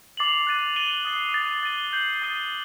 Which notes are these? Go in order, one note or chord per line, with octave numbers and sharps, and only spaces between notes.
D6 A6 C7 F#7
F#6 A6 D#7
A6 D#7 G7
D#6 A6 C7 G7
D#6 A6 D#7
A6 D#7 G7
G6 C7 F#7
D#6 A6 D#7 G7